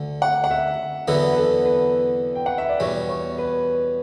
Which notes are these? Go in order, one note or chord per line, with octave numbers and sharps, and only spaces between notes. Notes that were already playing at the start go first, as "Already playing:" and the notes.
Already playing: D2 D3
F#5
F#5
E5
E2 D3 F#3 B3 E4 B4
B4
A4
B4
G5
F#5
E5
D5
E2 B2 G3 C#5
C#5
B4